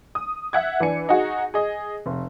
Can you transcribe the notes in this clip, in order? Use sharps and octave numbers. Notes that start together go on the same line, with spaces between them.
D#6
E5 F#5 G#6
E3 D4 G#5 C#7
D#4 F#4 G#4
G#4 D#5
F1